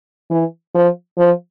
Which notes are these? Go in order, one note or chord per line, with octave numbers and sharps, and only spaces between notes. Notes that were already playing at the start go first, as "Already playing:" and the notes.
E3
F3
F3